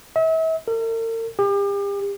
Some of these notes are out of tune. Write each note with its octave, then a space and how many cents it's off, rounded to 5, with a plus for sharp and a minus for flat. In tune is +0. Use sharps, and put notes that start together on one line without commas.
E5 -40
A#4 -45
G4 +40